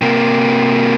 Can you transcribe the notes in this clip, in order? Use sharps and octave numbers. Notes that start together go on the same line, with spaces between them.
C3 A#3